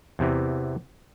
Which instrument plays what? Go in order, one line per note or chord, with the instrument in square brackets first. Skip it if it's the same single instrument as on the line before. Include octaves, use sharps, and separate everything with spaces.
[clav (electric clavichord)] E2 C3 E3